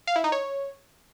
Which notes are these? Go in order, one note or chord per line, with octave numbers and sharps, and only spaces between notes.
F5
E4
D#4
C#5